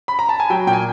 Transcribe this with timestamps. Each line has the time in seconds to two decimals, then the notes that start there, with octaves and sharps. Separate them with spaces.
0.08 B5
0.19 A#5
0.29 A5
0.40 G#5
0.50 F#3 G5
0.67 A#2 G5
0.73 G#5